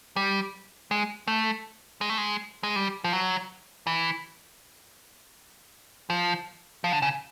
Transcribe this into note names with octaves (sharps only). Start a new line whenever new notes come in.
G3
G#3
A3
G#3
A3
G#3
G#3
G3
F3
F#3
E3
F3
F3
D3
C#3